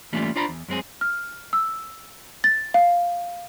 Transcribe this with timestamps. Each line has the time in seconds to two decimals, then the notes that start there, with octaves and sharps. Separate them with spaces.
0.13 E3 G3 A3 A#3 C#4 F4
0.36 D4 F4 C5 D5 A#5 B5
0.49 E2
0.68 F#2 G#3 C4 G#4
1.01 F6
1.53 E6
2.44 A6
2.74 F5